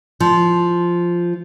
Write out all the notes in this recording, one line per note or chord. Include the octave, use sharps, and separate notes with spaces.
F3